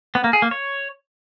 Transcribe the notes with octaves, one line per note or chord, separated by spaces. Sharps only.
B3
A#3
G#4
A#3
C#5